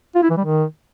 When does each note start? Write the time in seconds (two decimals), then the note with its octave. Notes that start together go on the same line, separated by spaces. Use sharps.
0.15 F4
0.22 E4
0.30 E3
0.37 G3
0.45 D#3